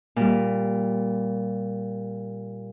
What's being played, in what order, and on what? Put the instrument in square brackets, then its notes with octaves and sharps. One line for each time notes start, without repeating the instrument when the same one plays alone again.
[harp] A#2 G3